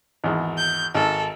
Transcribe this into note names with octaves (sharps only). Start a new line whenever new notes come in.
G#1 E2
G6
G#1 A4